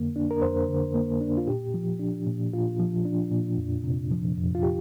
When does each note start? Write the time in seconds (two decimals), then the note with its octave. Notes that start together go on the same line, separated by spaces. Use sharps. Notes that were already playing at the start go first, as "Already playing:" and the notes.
Already playing: F2 D3 A#3
0.16 D4
0.31 A#4
0.42 F2 C5
0.69 D3
0.95 A#3
1.21 D4
1.38 F4
1.47 A#2 G4
1.74 F3
1.99 D4
2.27 A#2
2.53 A#2 F4
2.80 F3
3.05 D4
3.32 A#2
3.58 F2
3.84 C3
4.11 F3
4.37 F2
4.55 F4
4.63 G4